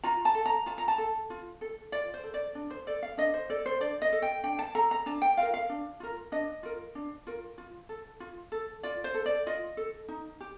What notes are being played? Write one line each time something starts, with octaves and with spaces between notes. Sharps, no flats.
F4 A#5
A5
A4
A#5
F4 A5
A#5
A5
A4
F4
A4
F4 D5
C5
A4
D5
D4
C5
A4 D5
F5
D4 D#5
C5
A4 D5
C5
D4 D5
D#5
A4
G5
D4 G5
A5
A4 A#5
A#5
D4 A5
G5
F4 A#4 F5
F5
D4
F4 A#4
D4 D#5
F4 A#4
D4
F4 A#4
F4
A4
F4
A4
F4 D5
C5
A4
D5
F4 D#5
A4
D#4
G4